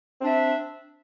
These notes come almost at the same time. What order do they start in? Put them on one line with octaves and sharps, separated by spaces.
C4 D4 E5